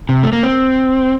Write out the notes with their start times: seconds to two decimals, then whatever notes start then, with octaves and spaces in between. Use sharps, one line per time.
0.09 C3
0.23 A3
0.33 A#3
0.43 C4